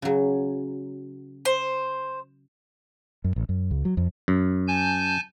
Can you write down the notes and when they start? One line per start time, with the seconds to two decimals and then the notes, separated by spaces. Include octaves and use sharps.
0.02 C#3 F#3
1.45 C5
3.24 F#2
3.36 A1
3.49 F#2
3.71 C#2
3.85 F#3
3.97 F2
4.28 F#2
4.68 G#5 A5 G6